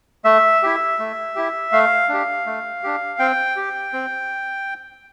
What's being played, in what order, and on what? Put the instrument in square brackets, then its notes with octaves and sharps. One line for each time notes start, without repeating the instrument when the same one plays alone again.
[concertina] A3 E5
E4 G4
A3
E4 G4
A3 F5
D4 G4
A3
D4 G4
C4 G5
G4
C4